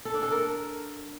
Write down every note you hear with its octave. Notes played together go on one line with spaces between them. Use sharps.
A4
D4
A4
A#4